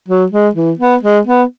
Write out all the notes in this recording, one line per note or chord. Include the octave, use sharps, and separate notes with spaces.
F#3
G#3
E3
B3
G#3
B3